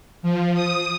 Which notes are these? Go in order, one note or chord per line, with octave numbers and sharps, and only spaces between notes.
F3
D#6